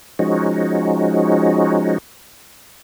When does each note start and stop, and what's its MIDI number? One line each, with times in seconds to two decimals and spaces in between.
0.19 1.98 53
0.19 1.98 56
0.19 1.98 61
0.19 1.98 63
0.19 1.98 66